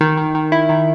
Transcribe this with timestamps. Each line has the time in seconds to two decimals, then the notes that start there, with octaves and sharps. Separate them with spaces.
0.01 D#3
0.17 D#3
0.35 D#3
0.52 E4
0.69 D#3